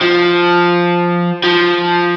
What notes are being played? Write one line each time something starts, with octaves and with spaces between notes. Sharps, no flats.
F3
F3